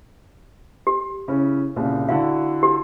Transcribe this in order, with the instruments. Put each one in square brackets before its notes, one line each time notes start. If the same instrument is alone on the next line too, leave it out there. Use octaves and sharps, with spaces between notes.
[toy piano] G4
[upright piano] C#3 C#4 E4
C2 A#2 C#3
[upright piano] D3 E4 F#4 [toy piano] F5
[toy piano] G4